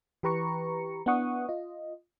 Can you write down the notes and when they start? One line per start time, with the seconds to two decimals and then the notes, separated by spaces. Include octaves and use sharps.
0.23 E3 G4 B4 A#5 C#6 C#7
1.06 B3 D4 E4 F#5 C#6 D#6
1.49 F4 D#5